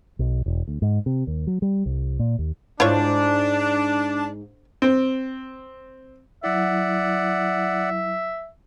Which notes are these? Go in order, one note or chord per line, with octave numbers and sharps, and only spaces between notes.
B1
E1
D2
G#2
C3
D#2
F#3
G3
C2
A#2
D#2
G#2 D4 E4 F4 C#5
C4
F#3 E4 D5 E5 F#5